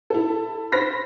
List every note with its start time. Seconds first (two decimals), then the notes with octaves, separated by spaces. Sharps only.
0.10 E4 A4
0.72 C5 B5 A#6 B6